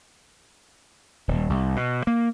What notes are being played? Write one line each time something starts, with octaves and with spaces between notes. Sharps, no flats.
D#1
C2
B2
A#3